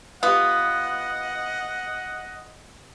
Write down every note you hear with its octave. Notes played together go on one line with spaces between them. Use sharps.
B3 F4 G4 D#5 F#5